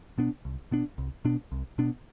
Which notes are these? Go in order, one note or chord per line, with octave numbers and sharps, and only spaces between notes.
B2 B3 D4
C2
B2 B3 D4
C2
B2 B3 D4
C2
B2 B3 D4